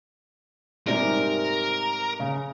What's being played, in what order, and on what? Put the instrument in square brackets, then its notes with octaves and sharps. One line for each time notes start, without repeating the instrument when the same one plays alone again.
[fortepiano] G#2 C3 G3 [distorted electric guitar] A#4
[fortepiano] C#3